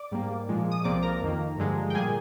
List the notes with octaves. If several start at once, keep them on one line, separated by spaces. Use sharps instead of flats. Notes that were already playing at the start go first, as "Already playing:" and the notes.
Already playing: D5 D6
G#2 G3 A#3
A#2 F3 G#3
D#6
C2 C3 F3 A#3 D5 D6
A#4 A#5
F2 D#3 A#3
G2 D3 F3 G#3
G5
A#2 G3 A#3 G#4 G#5